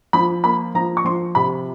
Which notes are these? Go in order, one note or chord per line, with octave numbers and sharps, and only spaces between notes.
F3 B5
A#3 B5
F3 A#5
C#6
F3 C6
C3 B5